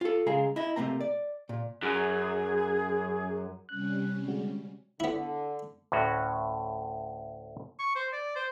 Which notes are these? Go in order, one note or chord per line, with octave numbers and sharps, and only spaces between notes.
F4 A4
C#3 G#3 G#4 F5 A#5
E4 D#5
C3 A3 A#3 C4 A#5
D5
A#2
F#2 G#4
C3 G3 C#4 F#6
D3 G#3 F#4
D3 B3 E4
D2 A2 C#4 F#4
C#6
C5
D5
C5